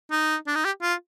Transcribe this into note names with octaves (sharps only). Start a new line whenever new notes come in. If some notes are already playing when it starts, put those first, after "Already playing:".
D#4
D4
D#4
G4
F4